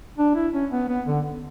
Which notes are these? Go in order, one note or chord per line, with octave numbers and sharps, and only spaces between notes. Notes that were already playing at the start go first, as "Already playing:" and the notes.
D4
E4
C#4
B3
B3
D3